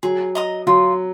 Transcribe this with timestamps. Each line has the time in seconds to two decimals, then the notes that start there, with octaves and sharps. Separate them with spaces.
0.03 F#3 G#4
0.35 D#5 A#5 D#6
0.67 F#3 F4